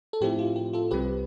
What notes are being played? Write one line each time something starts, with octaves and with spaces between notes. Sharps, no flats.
A4
A2 F3 C4 E4 G4
F4
G4
F4 A4
C2 C3 G3 C4 G4 B4